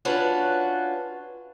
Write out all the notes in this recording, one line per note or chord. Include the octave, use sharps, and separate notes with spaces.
C#4 D4 F4 F#4 B4 C#5